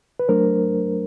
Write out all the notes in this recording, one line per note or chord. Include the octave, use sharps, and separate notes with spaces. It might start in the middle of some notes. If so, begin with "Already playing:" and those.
B4
F#3 A3 D4 A#4 C5